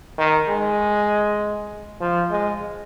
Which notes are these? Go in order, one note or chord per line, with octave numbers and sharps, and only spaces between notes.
D#3
G#3
F3
G#3